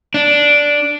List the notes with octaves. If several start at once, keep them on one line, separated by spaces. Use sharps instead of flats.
D4